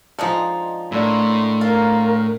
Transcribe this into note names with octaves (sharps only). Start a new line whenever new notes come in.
D3 F3 G#3 D#4 C5
A2 A#3 D4 E4 C6
F4 A#4